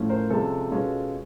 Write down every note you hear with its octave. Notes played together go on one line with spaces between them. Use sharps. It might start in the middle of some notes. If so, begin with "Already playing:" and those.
Already playing: A2 F3 A3 C#4
A#4 C5
C3 F3 G#3 C#4 A4
B2 G#3 C#4 F4